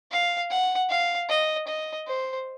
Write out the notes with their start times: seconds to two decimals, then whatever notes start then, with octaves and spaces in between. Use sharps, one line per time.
0.11 F5
0.50 F#5
0.89 F5
1.29 D#5
1.67 D#5
2.07 C5